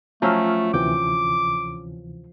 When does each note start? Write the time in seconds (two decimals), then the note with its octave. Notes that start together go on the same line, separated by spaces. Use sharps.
0.22 F3 F#3 A3 C#4 F4 E6 F6
0.74 D2 C3 E3 G5 D6